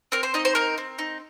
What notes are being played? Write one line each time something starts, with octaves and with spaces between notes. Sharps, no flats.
C4 A#4
C5
D#4 D#5
C5
C4 A#4
C4
D#4